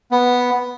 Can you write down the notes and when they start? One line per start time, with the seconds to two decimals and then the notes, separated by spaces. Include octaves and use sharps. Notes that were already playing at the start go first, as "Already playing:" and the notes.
0.11 B3